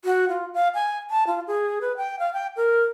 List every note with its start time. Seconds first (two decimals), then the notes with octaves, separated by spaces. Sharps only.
0.05 F#4
0.29 F4
0.54 F5
0.74 G#5
1.10 A5
1.27 F4
1.47 G#4
1.81 B4
1.97 G5
2.19 F5
2.33 G5
2.56 A#4